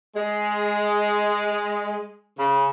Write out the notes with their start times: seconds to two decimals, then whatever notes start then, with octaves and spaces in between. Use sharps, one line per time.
0.15 G#3
2.39 C#3